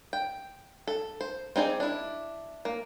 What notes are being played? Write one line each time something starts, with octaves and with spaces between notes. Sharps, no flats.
G5
A4
C5
C4 D#4 G#4 D5
D4 E4
A#3